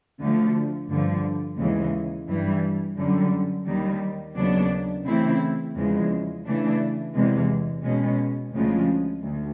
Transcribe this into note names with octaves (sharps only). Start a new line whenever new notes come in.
D2 D3 F3 A3
G2 D3 F3
D#2 C#3 E3 G#3
G2 E3 G3
F#2 D3 G3
D#2 D#3 G3
D#2 C#3 F#3 B3 D4
C#3 E3 A3 C4 E4
E2 C#3 F3 G#3
C#3 E3 A3 D4
E2 C3 E3 G#3
B2 G#3 C#4
D2 C#3 F3 G#3
D2